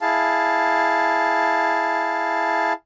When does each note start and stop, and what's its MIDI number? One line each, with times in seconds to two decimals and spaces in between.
0.01 2.73 64
0.01 2.73 68
0.01 2.73 77
0.01 2.73 81